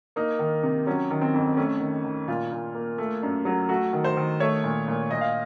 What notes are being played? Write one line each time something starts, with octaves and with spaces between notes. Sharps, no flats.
A#3 D#4
D#3
C3
F#3 C#4
D#3
C4
F2
A3 C#4
D#3
D#3
A#2 F4
A#2
A#3
A3
F#2
F#3
A3 F#4
D#3
C5
D#3
A3 C#5
A#2
A#2
A#2 D#5
F5